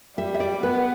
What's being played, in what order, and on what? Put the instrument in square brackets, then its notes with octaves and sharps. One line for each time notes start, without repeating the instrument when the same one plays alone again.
[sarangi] G3 [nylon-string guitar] E5
[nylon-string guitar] E5
D5
[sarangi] B3 [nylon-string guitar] B4